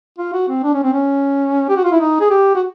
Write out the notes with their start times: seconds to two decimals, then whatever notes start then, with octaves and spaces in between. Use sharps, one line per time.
0.18 F4
0.33 F#4
0.49 C4
0.64 D4
0.74 C#4
0.83 C4
0.93 C#4
1.69 G4
1.76 F#4
1.84 F4
1.92 E4
2.00 D#4
2.20 G#4
2.30 G4
2.55 F#4